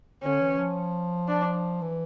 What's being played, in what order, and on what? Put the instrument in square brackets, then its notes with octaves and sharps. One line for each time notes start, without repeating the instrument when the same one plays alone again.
[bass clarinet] D3 [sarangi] C#4
[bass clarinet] E3
F3
[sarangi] D4
[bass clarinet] E3